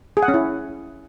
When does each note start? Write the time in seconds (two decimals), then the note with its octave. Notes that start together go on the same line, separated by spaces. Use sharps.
0.17 G#4
0.23 F#5
0.28 C#4
0.34 E4